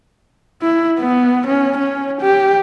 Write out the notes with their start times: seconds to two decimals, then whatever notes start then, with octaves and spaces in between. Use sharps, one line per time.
0.62 E4
1.00 B3
1.46 C#4
1.77 C#4
2.21 G4